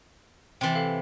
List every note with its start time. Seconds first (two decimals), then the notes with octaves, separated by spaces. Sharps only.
0.61 C3 E3 G5 C6 A6
0.75 A4 F5